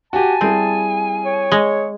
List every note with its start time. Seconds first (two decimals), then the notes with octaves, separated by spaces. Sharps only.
0.13 F#4 G4 G#5 A5
0.41 G3 C4 E4 G#4
1.25 C#5
1.52 G#3